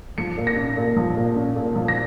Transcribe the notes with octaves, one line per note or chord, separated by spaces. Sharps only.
F3 C#7
A#2
A#6
C#4
A#2
F3
A#2
C#4
A#2
F3
A#6